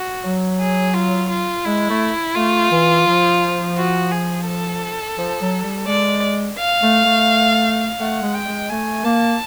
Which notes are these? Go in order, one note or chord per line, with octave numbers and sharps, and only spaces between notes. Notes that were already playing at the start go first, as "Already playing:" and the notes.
Already playing: F#4
F#3
G#4
F4
F4
G#3 E4
A3
A3 F4
E3
F3
F#4
G#4
A4
F3
F#3
G3
G#3 D5
F5
A3
A3
A3 F#5
G#3
G5
G#3
A3 G#5
A#3 A5